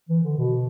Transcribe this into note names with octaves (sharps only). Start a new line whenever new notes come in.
E3
D3
B2